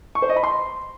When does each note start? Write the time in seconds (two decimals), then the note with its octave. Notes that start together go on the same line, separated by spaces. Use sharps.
0.15 C#6
0.22 C5
0.29 D#5
0.36 B5
0.44 C6